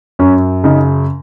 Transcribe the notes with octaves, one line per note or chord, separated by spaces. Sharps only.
F#2 C#4
C#3 D#4